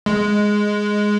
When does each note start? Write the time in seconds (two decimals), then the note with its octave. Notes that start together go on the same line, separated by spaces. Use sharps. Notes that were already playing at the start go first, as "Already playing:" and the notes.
0.06 G#3